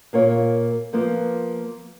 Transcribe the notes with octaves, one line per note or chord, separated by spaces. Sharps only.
A#2 A#3 F4 C#5
F3 A#3 B3 F4